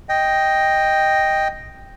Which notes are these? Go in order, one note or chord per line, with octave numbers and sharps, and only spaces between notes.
D#5 G5